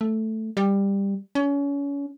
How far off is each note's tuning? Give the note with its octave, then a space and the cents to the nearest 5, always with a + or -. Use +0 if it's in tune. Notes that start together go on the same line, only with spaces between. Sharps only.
A3 +0
G3 +15
C#4 +30